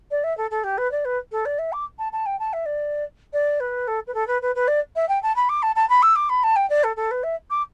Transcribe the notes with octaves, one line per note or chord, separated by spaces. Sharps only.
D5
E5
A4
A4
G4
B4
D5
B4
A4
D5
E5
D6
A5
A5
G5
A5
E5
D5
D5
B4
A4
B4
A4
B4
B4
B4
D5
E5
G5
A5
B5
D6
A5
A5
B5
E6
D6
B5
A5
G5
D5
A4
A4
B4
E5
D6